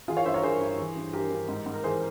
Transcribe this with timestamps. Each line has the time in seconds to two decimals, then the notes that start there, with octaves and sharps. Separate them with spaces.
0.08 E3 F4 G#4
0.17 C#5 F5
0.25 G2 C5 E5
0.34 A#4 C#5
0.43 G2 G#4 C5
0.61 G2
0.78 E3
0.96 G2
1.13 G2 G4 A#4
1.31 G2
1.48 G#2
1.66 G#2
1.73 A#4
1.84 E3 G#4 C5